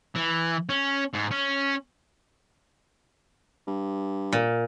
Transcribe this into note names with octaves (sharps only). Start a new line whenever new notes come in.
E3
C#4
G#2
C#4
G2
A#2